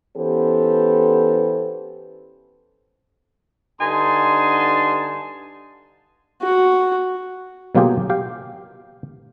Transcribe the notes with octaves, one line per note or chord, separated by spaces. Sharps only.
E3 B3 C#4 G4 A4 C5
G2 D3 D#4 G#5 A5 C6
F#4
B2 F#3 A#3 F4 G4 G#4
G4 F5 G5